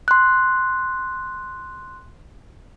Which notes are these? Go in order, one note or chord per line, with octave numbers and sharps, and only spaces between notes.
C6 F#6